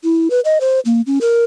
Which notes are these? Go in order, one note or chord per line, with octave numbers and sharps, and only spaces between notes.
E4
B4
D#5
C5
A#3
C#4
A#4